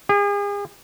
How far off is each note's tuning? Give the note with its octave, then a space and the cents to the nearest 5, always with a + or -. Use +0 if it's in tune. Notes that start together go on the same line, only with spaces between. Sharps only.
G#4 -40